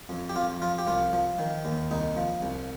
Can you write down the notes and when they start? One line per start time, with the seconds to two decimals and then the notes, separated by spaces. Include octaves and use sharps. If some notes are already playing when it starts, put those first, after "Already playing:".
0.09 F2
0.29 G4
0.35 F2 F4
0.62 F3 F4
0.78 G4
0.87 C2 F4
1.13 F3
1.39 D#3
1.65 D#2
1.91 C2 D#4
2.17 F3
2.42 C2